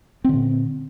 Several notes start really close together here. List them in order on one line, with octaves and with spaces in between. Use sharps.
C4 D3 A#2